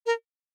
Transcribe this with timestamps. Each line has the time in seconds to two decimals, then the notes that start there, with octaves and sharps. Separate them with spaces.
0.06 A#4